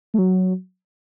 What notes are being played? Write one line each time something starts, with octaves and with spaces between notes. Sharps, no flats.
A3
F#3